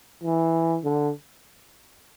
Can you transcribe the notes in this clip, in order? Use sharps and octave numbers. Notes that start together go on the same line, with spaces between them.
E3
D3